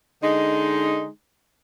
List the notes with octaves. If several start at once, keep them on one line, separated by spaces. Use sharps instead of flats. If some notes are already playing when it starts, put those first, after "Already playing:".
D3 G#3 D#4